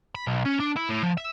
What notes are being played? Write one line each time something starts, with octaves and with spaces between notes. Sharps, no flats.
B5
B1
C#4
D4
E4
A2
F3
E5